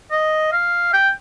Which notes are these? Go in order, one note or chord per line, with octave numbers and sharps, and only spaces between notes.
D#5
F5
G5